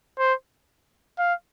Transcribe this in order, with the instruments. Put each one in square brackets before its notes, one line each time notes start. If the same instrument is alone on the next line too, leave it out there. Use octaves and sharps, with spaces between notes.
[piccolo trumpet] C5
F5